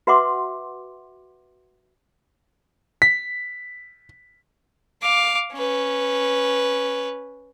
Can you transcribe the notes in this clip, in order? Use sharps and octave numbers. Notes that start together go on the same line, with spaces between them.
F#4 B4 E5 F#5 C6 D6
B6
F5 D6
C#4 B4